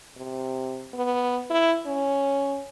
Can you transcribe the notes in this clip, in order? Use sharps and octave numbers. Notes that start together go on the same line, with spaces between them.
C3
B3
E4
C#4